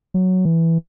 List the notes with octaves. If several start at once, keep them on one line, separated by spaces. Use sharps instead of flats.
F#3
E3